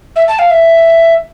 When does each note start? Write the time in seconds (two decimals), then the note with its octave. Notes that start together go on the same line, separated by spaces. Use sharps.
0.16 E5
0.28 A5
0.39 F5
0.50 E5